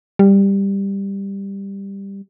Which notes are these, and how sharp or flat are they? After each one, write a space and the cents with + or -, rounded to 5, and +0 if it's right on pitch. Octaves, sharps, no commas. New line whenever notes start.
G3 +10